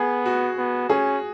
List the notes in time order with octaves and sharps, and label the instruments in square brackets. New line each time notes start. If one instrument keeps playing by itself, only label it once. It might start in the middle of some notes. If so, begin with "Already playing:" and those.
Already playing: [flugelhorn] B3 [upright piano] G#4
[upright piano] F#4
[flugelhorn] B3
[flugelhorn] C#4 [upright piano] G#4